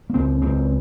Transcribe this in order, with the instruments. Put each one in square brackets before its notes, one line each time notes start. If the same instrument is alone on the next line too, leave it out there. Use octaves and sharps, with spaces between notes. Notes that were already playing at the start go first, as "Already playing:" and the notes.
[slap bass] A#3
C#2 C4
C#2 C4